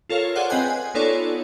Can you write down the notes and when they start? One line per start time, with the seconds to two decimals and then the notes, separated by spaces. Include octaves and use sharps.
0.09 F4 A4 A#4 C#5 F5
0.36 G#4 C5 D5 F5 F#5
0.50 C4 B4 D#5 G5 G#5 F#6
0.68 G#5
0.94 B3 D#4 F4 A4 C#5 D5